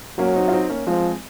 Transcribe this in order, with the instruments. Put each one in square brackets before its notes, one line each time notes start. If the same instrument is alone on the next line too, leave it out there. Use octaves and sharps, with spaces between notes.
[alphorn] F#3 [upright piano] A#3 C#4
[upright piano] C4 D#4
F4
C4 D#4
A#3 C#4
[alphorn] F3 [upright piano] G#3 C4